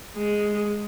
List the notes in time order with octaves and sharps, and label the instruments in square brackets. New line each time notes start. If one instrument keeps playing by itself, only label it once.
[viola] G#3